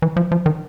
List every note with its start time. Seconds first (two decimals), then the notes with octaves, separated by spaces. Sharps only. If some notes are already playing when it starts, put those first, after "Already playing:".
0.02 E3
0.17 F3
0.32 F3
0.46 D#3